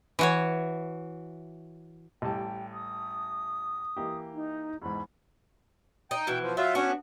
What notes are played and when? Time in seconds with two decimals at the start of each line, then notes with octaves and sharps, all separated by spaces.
0.19 E3 F#4 C#5
2.22 A1 G3 G5 A5
2.73 D#6
3.97 E3 A#3 G4
4.34 D#4
4.82 E2 G#2 B5
6.11 D#4 G5
6.27 B2 E3
6.41 F3
6.57 F#3 F4 E5
6.75 B3 C#4 D4 F#4